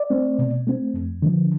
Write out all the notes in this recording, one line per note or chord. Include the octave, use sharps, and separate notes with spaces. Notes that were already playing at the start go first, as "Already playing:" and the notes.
Already playing: D5
A3 C4
B2
A3 C4
F2
D3 F3